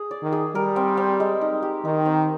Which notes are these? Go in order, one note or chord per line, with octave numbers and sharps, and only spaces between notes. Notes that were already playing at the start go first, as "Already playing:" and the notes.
Already playing: G#4
D5
D#3
G#4
G3 A#4
C4
C4
G#3
D#4
G4
D#3 D#4
C4